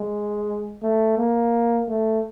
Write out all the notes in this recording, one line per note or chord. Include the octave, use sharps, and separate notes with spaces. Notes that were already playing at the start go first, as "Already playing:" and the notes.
Already playing: G#3
A3
A#3
A3